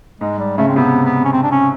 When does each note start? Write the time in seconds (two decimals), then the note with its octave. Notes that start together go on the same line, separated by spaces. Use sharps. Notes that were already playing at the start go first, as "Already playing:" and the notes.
0.20 G#2 G#3
0.39 G3
0.58 C#3 A3
0.68 C4
0.76 C3 B3
1.05 B3
1.25 C#4
1.33 C4
1.43 D4
1.52 C#4